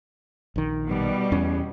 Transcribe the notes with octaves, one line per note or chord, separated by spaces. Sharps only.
A#1 D#3
B2 G3
E2 C#4